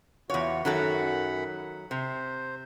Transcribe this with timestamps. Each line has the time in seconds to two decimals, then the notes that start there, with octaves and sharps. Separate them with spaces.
0.30 E2 E3 F4 F#4 C#5
0.65 F#2 D#3 F#3 A4 F#5 B5
1.91 C3 C5